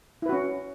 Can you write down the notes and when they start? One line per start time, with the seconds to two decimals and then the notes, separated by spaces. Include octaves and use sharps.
0.22 E4
0.26 B4
0.29 F#4
0.33 C#4